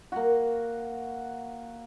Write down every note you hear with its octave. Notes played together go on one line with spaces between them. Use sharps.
A#3 F#4